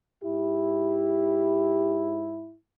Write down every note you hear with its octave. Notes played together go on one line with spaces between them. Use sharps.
G#2 E4 G4